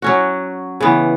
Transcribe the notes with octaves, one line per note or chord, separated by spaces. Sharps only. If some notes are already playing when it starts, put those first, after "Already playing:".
F#3 C#4 F#4
C#3 E3 B3